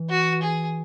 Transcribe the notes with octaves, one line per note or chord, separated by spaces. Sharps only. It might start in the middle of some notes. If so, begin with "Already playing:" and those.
Already playing: E3
F#4
G#4